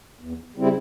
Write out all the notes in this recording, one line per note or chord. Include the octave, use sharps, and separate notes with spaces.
E2
C#3 G3 C4 E4